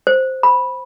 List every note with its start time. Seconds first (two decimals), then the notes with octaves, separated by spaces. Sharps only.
0.07 C5
0.43 B5